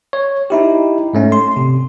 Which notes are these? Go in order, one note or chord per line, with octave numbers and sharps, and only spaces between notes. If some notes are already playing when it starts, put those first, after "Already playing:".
C#5
D#4 E4 G4
G#2 A3 C#4
C6
C3